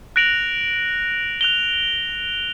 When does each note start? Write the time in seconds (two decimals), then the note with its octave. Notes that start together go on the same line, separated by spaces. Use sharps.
0.16 F#6 A#6 D7 F7 F#7
1.41 F#6 F7 G7